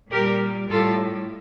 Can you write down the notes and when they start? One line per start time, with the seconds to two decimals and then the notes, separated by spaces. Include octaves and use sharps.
0.12 A#2 G3 G4 A#4
0.69 A2 G3 F4 A4